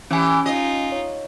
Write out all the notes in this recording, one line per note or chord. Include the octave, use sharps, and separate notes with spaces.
E3 C#4 G4 G#5
D#4 F4 D#5
C#5